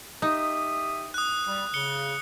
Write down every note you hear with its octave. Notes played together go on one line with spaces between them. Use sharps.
D#4 G4 E5 D#6
D#6 F#6
G3
C#3 C#7 G7